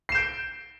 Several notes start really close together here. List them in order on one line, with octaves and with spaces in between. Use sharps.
C7 E7 G6 D7